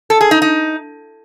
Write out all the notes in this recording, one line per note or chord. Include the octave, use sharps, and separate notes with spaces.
A4
G#4
D#4
D#4